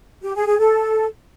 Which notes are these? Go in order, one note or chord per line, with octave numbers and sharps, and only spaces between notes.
G4
G#4
G#4
A4